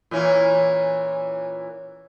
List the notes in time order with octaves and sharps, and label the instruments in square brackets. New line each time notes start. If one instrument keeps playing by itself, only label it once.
[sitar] A#2 E3 C#4